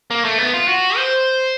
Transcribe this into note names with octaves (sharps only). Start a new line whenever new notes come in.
A#3
A3
B3
F4
F#4
C5